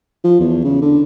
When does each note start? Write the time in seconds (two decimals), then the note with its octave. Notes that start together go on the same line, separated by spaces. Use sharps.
0.24 F3
0.39 E2
0.64 C#3
0.81 D3